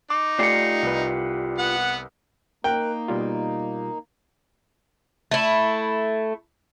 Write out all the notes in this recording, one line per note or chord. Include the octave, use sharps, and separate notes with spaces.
D#4 D6
A3 F4 G4 D5 C7 C#7
C2 B4
B3 F#5
A#3 D#4 A#4 G5 F#6
B2 G3 F4
A3 E4